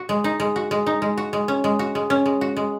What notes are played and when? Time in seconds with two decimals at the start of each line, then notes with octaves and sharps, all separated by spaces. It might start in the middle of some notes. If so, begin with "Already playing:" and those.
Already playing: F#4
0.09 G#3
0.24 D#4
0.40 G#3
0.56 F#4
0.71 G#3
0.87 D#4
1.02 G#3
1.17 F#4
1.33 G#3
1.48 C#4
1.64 G#3
1.79 F#4
1.95 G#3
2.10 C#4
2.26 G#3
2.41 F#4
2.57 G#3